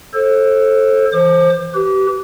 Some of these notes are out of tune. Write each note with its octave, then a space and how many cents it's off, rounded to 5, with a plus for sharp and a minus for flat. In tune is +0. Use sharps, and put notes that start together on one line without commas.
A4 +0 C5 +35
E3 +0 C5 +20 D6 +35
G4 -30 B4 +0